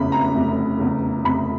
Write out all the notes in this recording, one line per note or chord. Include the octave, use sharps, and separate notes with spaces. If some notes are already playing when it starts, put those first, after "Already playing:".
Already playing: F1 E2 C#3 B5
A#5
F1
E2 C#3
F1 B5